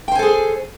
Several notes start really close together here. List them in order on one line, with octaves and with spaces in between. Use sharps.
G5 C5 G#5 A4 G#4